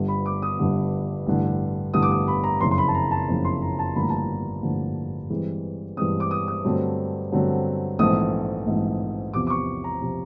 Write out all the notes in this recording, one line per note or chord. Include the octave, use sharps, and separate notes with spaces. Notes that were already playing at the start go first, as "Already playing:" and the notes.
Already playing: G1 G2 D3
B5
D6
D#6
G1 G2 D3
A1 G2 D3
A1 G2 D3 D#6
D6
D#6
B5
A#5
F#1 F2 C#3 C6
C6
B5
A5
A#5
A5
F#1 F2 C#3
C6
A#5
A5
A1 G2 D3 F3 A#3 B5
A#5
A5
A#5
A1 G2 D3 F3 A#3
G2 E3 G#3 C4
G2 E3 G#3 C4 D#6
D6
D#6
D#6
G2 D3 F#3 A3 C4
G2 D3 F#3 A3 C4
A#1 G#2 E3 A3 C4 D#6
A#1 G#2 E3 A3 C4
E2 C3 F3 D6
D6
C#6
A#5
C3 F3